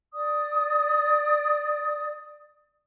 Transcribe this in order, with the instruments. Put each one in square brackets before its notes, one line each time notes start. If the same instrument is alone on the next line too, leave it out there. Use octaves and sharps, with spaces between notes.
[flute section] D5 D#6